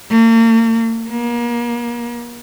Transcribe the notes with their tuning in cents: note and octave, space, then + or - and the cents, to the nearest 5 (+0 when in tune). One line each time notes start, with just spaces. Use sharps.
A#3 -40
A#3 +35